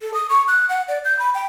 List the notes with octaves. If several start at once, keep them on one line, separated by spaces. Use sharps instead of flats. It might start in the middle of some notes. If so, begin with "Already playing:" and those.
A4
D#6
C#6
F#6
F#5
D5
G6
B5
G5